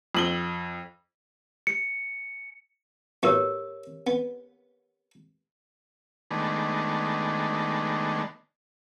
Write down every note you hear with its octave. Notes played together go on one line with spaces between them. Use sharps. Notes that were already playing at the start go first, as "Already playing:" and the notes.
F2 F#7 G7
C#7
A2 F#3 B3 G4 A#4 C#5
B3
D#3 G#3 A3 B3 D4